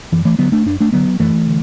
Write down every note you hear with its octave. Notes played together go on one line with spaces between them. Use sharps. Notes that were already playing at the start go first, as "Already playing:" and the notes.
F#2 E3
E3 A3
D3 F#3 B3
A3 D4
F#2 D4
A3 D4
D3 F#3 B3
F#2 E3 A3
D3